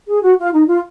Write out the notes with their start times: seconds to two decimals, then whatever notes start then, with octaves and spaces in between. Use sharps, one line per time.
0.08 G#4
0.23 F#4
0.39 F4
0.53 D#4
0.68 F4